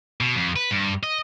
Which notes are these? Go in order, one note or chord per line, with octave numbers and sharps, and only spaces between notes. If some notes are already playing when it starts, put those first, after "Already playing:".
B2
F2
B4
G2
D#5